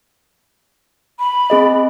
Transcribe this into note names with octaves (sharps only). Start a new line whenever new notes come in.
B5
C4 G#4 D#5